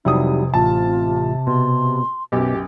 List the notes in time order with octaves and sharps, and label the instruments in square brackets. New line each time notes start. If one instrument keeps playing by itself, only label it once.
[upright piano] F1 D#6 [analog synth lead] C3 [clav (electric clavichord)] F#3 G3 E4 [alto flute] D#4
[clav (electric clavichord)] A1 [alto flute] F4 [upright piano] A5
[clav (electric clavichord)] B2 [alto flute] C6
[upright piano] B1 F#2 [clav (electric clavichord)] B2 [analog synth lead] G4